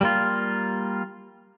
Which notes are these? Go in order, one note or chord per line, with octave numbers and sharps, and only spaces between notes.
G3 A#3 F4